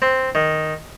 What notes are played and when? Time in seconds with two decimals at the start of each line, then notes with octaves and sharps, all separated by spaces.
0.02 C4
0.35 D#3